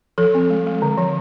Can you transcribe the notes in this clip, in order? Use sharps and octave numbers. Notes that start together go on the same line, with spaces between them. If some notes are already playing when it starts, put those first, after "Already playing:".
F3 A4
C4
G#3
G#3
D3
F3